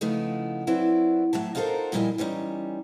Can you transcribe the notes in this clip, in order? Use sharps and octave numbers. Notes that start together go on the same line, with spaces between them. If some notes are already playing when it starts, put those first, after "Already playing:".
C#3 F3 A3 B3 D#4 E4
F#3 C4 E4 B4 D5
A2 F#3 E5 A5
D#4 F4 F#4 A4 A#4 C5
A#2 F3 G3 E4 D#5 G#5
E3 G3 C#4 D#4